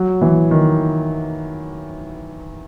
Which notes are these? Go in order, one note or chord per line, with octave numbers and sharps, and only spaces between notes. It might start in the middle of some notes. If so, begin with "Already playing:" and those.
Already playing: F#3
E3
D#3